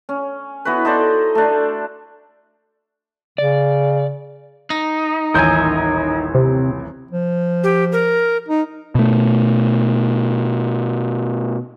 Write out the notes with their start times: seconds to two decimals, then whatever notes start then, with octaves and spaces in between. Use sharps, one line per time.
0.09 C#4
0.65 B3 E4 F#4 B4
0.85 D#4 A4 C5 D5
1.35 A3 D4
3.38 C#3 D5
4.70 D#4
5.34 D#1 A1 A#4 E5 G#5 G6
6.35 C3
7.11 F3
7.64 G4
7.92 A#4
8.48 D#4
8.95 B2 A3